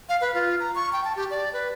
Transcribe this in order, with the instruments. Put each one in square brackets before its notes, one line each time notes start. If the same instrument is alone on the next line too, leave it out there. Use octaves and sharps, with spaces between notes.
[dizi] F5
B4
F4
A#5
C#6
G5
A5
G4
D5
B4